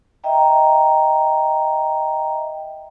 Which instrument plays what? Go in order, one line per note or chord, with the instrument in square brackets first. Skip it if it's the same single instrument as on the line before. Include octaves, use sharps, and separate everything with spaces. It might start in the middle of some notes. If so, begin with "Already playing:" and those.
[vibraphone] D#5 E5 G5 A#5